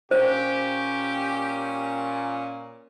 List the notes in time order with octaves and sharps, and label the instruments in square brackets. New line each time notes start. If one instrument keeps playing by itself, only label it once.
[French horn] A#2 [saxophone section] C#4 [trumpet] G4 [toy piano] C5